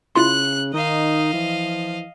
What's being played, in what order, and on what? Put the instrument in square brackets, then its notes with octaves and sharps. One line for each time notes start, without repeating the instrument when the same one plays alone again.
[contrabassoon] C#3 [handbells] E4 F4 C6 [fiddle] F#6
[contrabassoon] D#3 [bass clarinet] D#4 [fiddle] D#5 F5
[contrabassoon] E3 [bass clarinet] F3